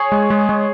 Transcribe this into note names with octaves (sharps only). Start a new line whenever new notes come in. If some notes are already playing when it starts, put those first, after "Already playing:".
Already playing: G#4 C#5
G#3
G#3
G#3